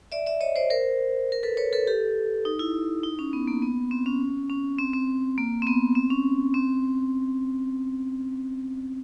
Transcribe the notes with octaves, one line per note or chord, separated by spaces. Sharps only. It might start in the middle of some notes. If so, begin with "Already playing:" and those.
D5 E5
D5 E5
C#5 D#5
C5 D5
A#4 C5
A#4
A4 B4
B4 C#5
A4 B4
G4 A4
D#4
E4
D#4
C#4
B3
A#3
B3
C4
C#4
C#4
C4
C4
A#3
C4
B3
C4
C#4
C4